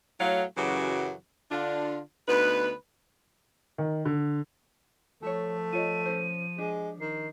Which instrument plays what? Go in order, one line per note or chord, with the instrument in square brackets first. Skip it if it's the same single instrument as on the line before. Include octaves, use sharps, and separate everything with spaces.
[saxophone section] A2 F#3 F5
F#2 C#3 E3 F#3 F#4 G4
D3 D4 F4
D2 B3 D#4 B4
[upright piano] D#3
D3
[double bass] F3 [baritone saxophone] A3 [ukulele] A4 C#5
[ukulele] F4 C#5 D#5 [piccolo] D#7
[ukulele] C#4 D#4 C5
[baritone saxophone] G#3 [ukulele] D4 G4
[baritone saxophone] D#3 [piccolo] C7